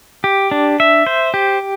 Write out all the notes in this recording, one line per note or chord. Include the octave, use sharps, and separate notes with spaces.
G4
D4
E5
C5
G4